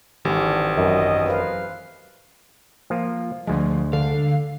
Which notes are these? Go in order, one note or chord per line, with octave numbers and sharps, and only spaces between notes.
G#1 D3 E3 G4
F#2 D#5
B4 C5 F5
F3 A#3 F4
D2 F3 G#3
D3 F5